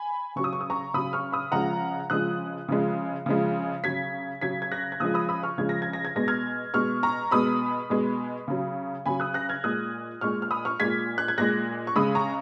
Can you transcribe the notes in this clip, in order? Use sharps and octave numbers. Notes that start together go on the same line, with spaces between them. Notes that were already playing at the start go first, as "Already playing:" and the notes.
Already playing: G#5 B5
C#3 F#3 C#6
D#6
C#6
D#6
A#5 C#6
C#3 F#3 B5 D#6
C#6 F6
B5 D#6
C#3 F3 G#3 F#5 A#5
C#3 F3 G#3 D#6 F#6
C#3 F3 G#3
C#3 F3 G#3
C#3 F#3 G#6 B6
C#3 F#3 G#6 B6
G#6
F#6 A#6
G#6
C#3 F3 G#3 D#6 F#6
B5 D#6
B5 D#6
C#6 F6
C#3 F3 G#3 G#6
A#6
G#6
A#6
G#6
B2 G#3 A#6
F6 G#6
B2 G#3 C#6 F6
A#5 C#6
B2 G#3 B5 D#6
B2 G#3
C#3 F#3
C#3 F#3 G#5 B5
D#6 F#6
F#6 A#6
F6 G#6
A#2 G#3 D#6 F#6
A#2 G#3 C#6 F6
F6
B5 D#6
C#6 F6
A#2 G#3 G#6 B6
F#6
G#6
A#2 G#3 F#6 A#6
C#6
C#3 G#3 B5 D#6
A#5 C#6